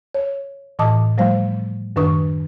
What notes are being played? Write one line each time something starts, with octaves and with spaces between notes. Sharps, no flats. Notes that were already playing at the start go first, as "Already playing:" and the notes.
C#5
A2 E3 D#5 A5 D6 D#6
F3 G3 A3 C5 F5
F#2 D#3 D4 B4 C#6 D#6